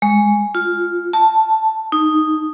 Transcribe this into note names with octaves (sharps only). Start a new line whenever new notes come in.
G#3
F4
A5
D#4